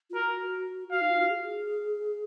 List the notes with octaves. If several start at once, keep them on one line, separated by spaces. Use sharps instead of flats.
F4
F#4 A#4
F#4 F5
D#4
F4
F#4
G#4